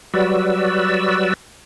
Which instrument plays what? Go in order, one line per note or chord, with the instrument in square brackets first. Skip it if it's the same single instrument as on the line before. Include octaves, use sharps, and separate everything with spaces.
[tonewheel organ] F#3 G3 F#4 B4 D5 E6